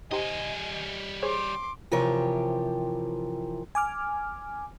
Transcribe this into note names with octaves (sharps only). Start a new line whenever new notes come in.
G3 D#4 G4 C5 D#5 G#5
G#4 C5 C#5 C6 D6
C3 E3 F3 G4 A#4 C#5
G#5 D6 F6